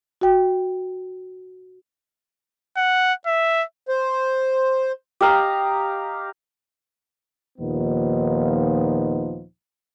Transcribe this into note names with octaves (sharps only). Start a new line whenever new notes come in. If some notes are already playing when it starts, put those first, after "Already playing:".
F#4 G5
F#5
E5
C5
G4 D#5 F5 A#5
D#2 A#2 F3 B3 D#4